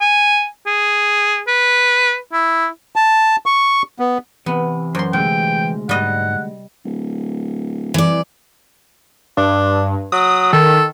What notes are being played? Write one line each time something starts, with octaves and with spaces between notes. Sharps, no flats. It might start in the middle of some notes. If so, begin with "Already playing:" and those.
G#5
G#4
B4
E4
A5
C#6
B3
C3 E3 B3
F#2 C5 C6
D2 C3 G#3 G5
G#2 G3 D#5 F#5
D1
C2 E3 D5
G2 D4
F#3 D#6
D#3 A4